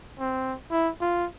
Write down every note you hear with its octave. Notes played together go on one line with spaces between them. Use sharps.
C4
E4
F4